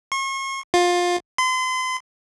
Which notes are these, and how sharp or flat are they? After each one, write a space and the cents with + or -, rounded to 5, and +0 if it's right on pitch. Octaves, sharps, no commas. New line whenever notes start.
C#6 -40
F4 +20
C6 -35